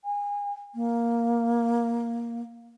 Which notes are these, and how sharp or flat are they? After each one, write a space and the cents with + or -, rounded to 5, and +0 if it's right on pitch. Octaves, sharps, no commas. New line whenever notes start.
G#5 -30
A#3 +5